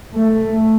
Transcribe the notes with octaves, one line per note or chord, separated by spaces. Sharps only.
A3